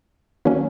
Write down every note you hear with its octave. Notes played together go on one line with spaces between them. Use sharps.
D#3 F#3 A#3 C#4